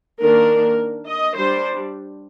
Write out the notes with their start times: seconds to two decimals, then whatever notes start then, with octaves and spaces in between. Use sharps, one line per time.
0.21 D#3 A#3 D4 A#4
1.08 D#5
1.36 G3 D4 C5